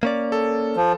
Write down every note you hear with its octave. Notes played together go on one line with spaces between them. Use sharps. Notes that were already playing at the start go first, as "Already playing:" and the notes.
A#3 C#4 D5
A4
F3